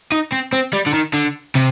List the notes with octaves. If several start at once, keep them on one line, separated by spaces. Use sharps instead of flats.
D#4
C4
C4
G3
D3
D#3
D3
C3